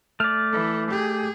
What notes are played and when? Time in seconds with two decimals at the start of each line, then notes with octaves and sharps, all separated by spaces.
0.20 A3 D5 F6
0.52 E3 A4
0.91 G4 G#4